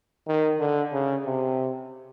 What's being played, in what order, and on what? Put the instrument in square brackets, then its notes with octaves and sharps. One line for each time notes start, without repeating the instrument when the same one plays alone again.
[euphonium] D#3
D3
C#3
C3